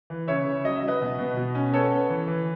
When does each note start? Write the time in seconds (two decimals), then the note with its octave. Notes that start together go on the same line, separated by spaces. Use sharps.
0.10 E3
0.28 C#3 C#5 E5
0.46 C#3
0.65 F#3 D#5
0.76 E5
0.83 F#3
0.88 B4 D#5
1.01 B2
1.18 B2
1.37 B2
1.55 C#4
1.73 B3 A4 C#5
1.91 B3
2.09 E3
2.27 E3